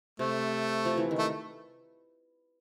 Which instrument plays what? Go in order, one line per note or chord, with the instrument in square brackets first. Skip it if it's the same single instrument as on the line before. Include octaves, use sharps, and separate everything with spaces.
[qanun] C3 [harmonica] A3
[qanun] F3
E3
D#3
[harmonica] A3